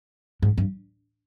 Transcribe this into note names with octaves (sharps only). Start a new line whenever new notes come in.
G#2
G2